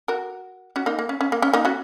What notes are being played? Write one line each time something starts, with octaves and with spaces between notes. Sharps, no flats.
F#4 A#4
C#4 F#4
A#3 D#4
A#3
C#4
C#4
A#3
C#4
A#3 D#4
C#4 F#4